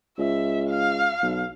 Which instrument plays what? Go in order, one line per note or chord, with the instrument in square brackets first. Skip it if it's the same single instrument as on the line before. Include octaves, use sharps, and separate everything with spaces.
[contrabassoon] C#2 [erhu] E5
[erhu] F5
[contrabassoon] B1